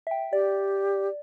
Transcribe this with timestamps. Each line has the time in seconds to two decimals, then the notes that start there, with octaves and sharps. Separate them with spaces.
0.07 E5 G5
0.33 G4 D5